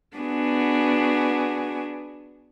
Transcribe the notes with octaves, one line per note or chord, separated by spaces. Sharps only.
B3 D4 F#4 G#4